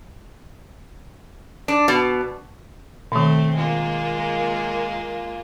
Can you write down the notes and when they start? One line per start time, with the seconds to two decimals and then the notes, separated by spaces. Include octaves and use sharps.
1.68 D4
1.88 B2
3.12 B2 D#3 A3 C4
3.56 G#3 A#3 F4